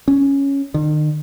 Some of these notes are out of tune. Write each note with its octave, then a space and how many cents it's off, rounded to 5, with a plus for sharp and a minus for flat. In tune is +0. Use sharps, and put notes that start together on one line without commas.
C#4 +0
D#3 -40